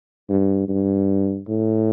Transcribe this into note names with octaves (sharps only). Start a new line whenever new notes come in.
G2
G2
A2